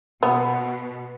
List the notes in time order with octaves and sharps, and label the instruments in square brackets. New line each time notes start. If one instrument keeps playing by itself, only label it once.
[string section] B2 [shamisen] B3